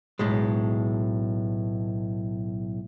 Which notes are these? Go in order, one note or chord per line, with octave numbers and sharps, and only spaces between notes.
B1 A2 G#3